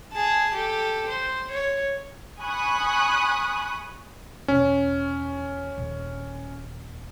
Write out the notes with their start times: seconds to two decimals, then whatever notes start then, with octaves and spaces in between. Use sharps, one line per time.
0.12 G#4 A5
0.54 G4 A4
1.07 C5
1.50 C#5
2.40 G#5 B5 C#6 D#6 F#6
4.48 E2 B2 C#4
5.78 D#1